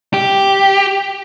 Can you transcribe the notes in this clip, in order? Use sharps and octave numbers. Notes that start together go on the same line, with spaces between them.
G4